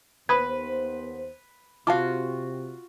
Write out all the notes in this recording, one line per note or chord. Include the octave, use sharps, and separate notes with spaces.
D#2 B3 B4 C5 B5 D#6 G#6
C3 F4 F#4 F5 A5 D6